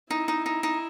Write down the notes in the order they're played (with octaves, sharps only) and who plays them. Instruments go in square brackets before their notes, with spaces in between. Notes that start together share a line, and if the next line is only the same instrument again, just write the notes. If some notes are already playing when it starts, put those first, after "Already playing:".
[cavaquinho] D#4 [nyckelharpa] E4
[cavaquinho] D#4
D#4
D#4